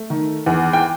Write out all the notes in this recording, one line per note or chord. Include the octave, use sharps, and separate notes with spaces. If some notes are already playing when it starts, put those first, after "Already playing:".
Already playing: A3
D#3
E2
G5